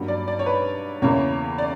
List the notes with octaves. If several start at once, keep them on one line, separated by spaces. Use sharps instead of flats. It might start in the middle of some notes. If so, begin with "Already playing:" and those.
Already playing: G2 F#3 A#3
D5
D5
C#5
B4
E2 C#3 E3 A#3 C#5
D5